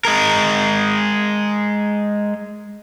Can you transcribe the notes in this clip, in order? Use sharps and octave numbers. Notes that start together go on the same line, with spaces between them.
G#3 A#4